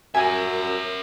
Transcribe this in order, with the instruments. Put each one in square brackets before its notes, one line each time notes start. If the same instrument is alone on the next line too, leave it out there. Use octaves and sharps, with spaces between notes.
[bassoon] F#2 [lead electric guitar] A#4 E5 [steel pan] G#5